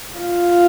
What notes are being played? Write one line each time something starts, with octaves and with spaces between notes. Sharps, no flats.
F4